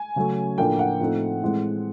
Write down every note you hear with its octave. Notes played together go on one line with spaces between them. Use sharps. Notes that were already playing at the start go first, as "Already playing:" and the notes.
Already playing: G#5
C#3 F#3 A3 C#4
A2 F3 A#3 D4 G5
F#5
A2 F3 A3 C4 D#4
A2 E3 G#3 C4